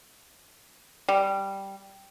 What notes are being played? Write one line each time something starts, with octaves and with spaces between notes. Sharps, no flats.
G3